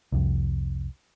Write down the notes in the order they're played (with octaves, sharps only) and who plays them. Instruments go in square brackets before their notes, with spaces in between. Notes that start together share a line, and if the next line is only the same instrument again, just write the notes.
[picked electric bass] C2 F2